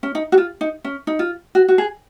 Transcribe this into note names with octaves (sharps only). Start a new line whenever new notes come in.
C#4
D#4
F#4
F4
D#4
C#4
D#4
F4
F#4
F#4
G#4